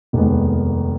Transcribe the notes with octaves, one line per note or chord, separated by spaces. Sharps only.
F1 D#2 D#3 G#3 B3